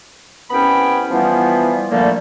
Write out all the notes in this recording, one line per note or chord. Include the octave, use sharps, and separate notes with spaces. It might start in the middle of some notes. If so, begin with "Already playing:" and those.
C2 B3 C#4 G5 B5
E3 F3 G3 B3
A#2 D3 F3 G3 A3 A#3